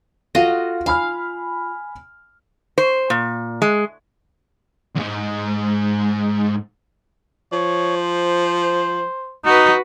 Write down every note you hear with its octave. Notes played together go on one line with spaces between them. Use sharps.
F4 F#4 A4 D#5 F5 F#5
F5 G#5 B5 F6
C5
A#2
G#3
E2 G#2
F3 C#5
C5
D#4 F#4 B4